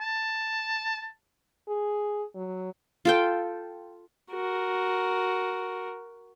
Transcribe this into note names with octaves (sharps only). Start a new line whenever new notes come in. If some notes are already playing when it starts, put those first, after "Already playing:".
A5
G#4
F#3
F4 A4 G5
F#4 A#4